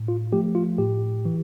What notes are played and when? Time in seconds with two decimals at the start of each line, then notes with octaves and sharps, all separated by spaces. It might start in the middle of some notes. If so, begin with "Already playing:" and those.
Already playing: A2
0.08 F4
0.32 F3 A3 G4
0.55 F4
0.78 A2 G4
1.25 E3